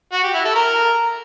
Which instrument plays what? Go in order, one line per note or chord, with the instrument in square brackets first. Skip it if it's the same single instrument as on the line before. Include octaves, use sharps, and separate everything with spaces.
[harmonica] F#4
G4
E4
A4
A#4